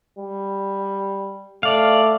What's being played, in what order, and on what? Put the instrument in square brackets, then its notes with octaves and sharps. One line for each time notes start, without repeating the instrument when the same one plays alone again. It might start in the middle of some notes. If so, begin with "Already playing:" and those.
[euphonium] G3
[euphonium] A3 [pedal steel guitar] D5 F5